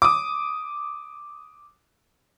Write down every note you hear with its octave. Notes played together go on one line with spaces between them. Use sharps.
D6 D#6